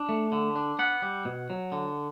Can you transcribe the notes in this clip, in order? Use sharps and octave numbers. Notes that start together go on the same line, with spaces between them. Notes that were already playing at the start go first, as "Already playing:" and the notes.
Already playing: D4
A3
D3
D4
B3 F#5
G3
B2
F#3
D3